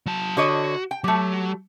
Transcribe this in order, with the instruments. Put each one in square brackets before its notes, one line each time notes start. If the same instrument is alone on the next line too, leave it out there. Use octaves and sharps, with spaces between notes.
[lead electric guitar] F#3 A5
[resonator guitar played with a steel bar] D3 C#5 D#5 [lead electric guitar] F#4
[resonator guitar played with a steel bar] G5
[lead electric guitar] F#3 [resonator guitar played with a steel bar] A3 G4